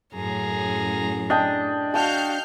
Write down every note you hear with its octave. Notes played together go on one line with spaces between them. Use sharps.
F#2 A2 G#4 A#5
D4 D#5 G5 A5
F#4 F5 G5 A5 F6 G6